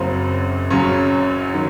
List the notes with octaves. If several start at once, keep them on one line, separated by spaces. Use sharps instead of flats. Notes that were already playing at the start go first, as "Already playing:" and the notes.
Already playing: F#1 F#2 C#3 F#3 C4
F#1 F#2 C#3 F#3 C#4
D#3 F#3